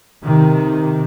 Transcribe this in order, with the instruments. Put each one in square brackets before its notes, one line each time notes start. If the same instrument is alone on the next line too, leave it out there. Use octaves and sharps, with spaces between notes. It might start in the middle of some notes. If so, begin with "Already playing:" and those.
[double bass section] C3 D#3